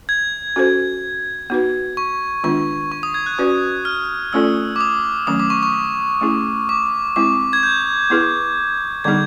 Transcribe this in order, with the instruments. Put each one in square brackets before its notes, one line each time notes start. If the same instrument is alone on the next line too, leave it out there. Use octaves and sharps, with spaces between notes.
[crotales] G#6
[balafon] C#4 F#4 A4 C5
B3 D#4 F#4 B4
[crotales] C#6
[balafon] D#3 G#3 B3 D4 F4 [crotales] C#6
[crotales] C#6
D#6
G#6
F#6
[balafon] C#4 F#4 B4 D5
[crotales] F6
[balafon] A3 C#4 F4 A4 D5 [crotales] E6
[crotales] D6
D#6
[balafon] D#3 F#3 A3 C#4 [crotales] D#6
[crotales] D6
C#6
C#6
[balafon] A3 C#4 E4 G#4
[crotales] D6
[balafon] G#3 C4 E4 [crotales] D6
[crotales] G#6
G6
[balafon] B3 E4 G#4 B4
[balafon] D3 G3 B3 D#4 G#4 [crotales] G#6